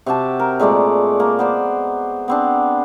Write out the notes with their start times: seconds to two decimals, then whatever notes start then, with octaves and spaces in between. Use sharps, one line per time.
0.06 C3 F#4 G4 A5
0.40 A#4
0.59 A#2 G#3 A3 D5
1.20 A#3
1.39 B3 C5 D5
2.28 B3 C4 D4